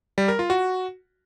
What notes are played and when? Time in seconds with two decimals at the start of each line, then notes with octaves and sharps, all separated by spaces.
0.18 G3
0.28 A#4
0.39 F4
0.50 F#4